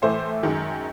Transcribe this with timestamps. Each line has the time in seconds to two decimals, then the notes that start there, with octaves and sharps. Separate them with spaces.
0.02 A2 E3 A3 C5
0.43 F#2 D#3 G#3